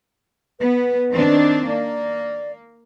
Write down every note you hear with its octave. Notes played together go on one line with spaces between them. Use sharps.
B3 B4
D#3 C4 D4
A#3 D5